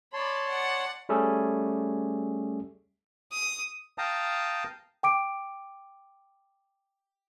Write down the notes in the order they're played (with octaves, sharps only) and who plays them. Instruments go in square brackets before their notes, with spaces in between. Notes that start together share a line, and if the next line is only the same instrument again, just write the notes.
[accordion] C#5 A5 C6 [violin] D5 B5
[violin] D5 F#5
[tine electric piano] G3 A3 C#4 G#4 A4
[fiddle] D#6
[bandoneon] F5 G5 A5 A#5 D#6
[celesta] G5 D6 D7